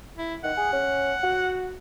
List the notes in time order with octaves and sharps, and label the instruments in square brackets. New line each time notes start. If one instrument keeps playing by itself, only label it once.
[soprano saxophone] E4
[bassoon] D#3 [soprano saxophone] F#5
[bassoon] G#4
C#4
F#4